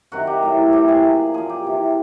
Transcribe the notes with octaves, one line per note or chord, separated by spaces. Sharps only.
C3 D#3 F#3 F#4
G4
A2 F#3
C3 E3 G4
G#4
A#2 F#3
A#2 F3 G#4
G4
C3 E3